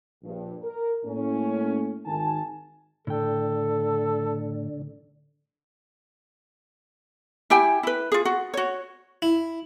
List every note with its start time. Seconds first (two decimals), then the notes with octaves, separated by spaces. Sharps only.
0.24 A#1 G2
0.62 A#4
1.05 A2 A#3 C#4
2.05 G#1 D#3 G#5 A5
3.07 A2 D3 A4 G5
7.50 E4 G4 G5 G#5
7.83 E4 B4
8.12 F4 G#4
8.25 F#4
8.54 F#4 C#5
9.22 E4